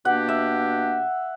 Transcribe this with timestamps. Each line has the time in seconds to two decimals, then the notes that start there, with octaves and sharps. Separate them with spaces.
0.05 B2 A#3 D4 G4 F#5
0.28 E5